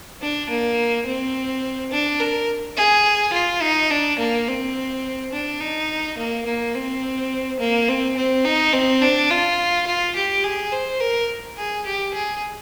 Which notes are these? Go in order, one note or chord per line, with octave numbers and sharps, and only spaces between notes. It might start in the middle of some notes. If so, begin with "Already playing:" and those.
D4
A#3
C4
D4
A#4
G#4
F4
D#4
D4
A#3
C4
D4
D#4
A#3
A#3
C4
A#3
C4
C4
D#4
C4
D4
F4
F4
G4
G#4
C5
A#4
G#4
G4
G#4